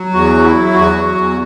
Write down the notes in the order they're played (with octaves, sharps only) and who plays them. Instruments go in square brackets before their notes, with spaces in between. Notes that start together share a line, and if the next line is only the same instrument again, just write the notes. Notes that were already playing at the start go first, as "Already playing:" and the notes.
Already playing: [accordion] F#3
E2 F#4
F#3
E4
F#3
E2 F#4
F#3
E2